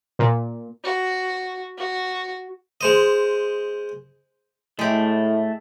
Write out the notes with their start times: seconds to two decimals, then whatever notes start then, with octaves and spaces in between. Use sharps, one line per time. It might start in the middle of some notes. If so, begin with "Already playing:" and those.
0.19 A#2
0.84 F#4
1.78 F#4
2.81 G#3 C5 D#5
4.79 A2 G#3 A3 G4